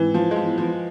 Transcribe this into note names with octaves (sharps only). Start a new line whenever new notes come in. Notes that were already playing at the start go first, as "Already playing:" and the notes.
Already playing: G#2 E3 G#3 C4 E4
F3
G#3
E3 F3 B3 E4
F3